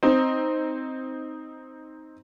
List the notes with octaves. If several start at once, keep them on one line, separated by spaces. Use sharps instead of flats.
C4 D#4